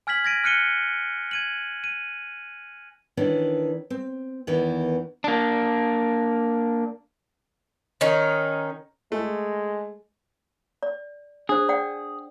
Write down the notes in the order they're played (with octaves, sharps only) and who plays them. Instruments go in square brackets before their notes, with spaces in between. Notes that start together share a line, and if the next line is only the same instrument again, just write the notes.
[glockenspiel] G#5 F6 G#6 B6 F#7
G#6 A#6 D7 D#7
F6 F#6 C#7 D#7 G7
G#6 D#7 F#7
D#7
[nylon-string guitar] D#3 E3 C#4 D4
C4
E2 D#3 E3
[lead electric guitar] A#3 D4
[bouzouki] D#3 C#4 D#4
[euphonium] G#3 [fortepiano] A3
[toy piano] D5
[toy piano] D4 C5 [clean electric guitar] G#4
[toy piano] D5 F#5 G5